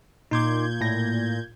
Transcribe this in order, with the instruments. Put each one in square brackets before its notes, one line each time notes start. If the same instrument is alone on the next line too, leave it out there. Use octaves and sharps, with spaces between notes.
[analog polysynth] A#2 G6 G#6 [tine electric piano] D#4 C6 D6
[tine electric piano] A2 A#6